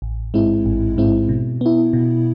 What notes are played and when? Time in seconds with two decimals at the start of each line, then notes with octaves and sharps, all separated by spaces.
0.02 A1
0.34 G#2 G#3 C4 E4
0.65 A1
0.98 G#2 G#3 C4 E4
1.29 B2
1.61 B3 E4
1.93 B2